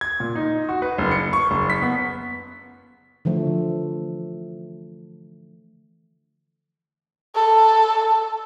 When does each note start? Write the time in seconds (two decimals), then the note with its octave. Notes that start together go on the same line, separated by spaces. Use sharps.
0.01 G#6
0.20 A#2
0.35 D#4
0.69 F#4
0.82 B4
0.98 F#1
1.11 C#7
1.33 C#6
1.51 F#1
1.70 B6
1.82 B3
3.25 D3 E3 F3 A3
7.35 A4